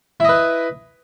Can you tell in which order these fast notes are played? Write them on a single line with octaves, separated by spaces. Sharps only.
E4 D#5 B4